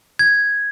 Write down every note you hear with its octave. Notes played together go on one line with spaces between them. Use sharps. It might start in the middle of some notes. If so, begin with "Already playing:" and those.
G#6